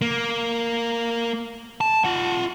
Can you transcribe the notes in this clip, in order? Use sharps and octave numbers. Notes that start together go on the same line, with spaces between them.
A#3
A5
F4 F#5